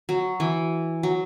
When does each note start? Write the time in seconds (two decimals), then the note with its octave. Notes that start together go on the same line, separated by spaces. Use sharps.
0.09 F#3
0.40 E3
1.03 F#3